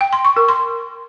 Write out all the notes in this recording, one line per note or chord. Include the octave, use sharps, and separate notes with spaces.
G5
C6
C#6
A#4
C6